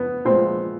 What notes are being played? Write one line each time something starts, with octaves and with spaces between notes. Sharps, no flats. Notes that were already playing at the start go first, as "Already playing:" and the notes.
Already playing: B3
A#2 F3 G#3 C4